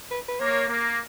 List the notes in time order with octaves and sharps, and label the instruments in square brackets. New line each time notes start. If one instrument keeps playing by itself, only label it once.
[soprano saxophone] B4
B4
[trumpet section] A#3 [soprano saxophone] C#5
[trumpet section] A#3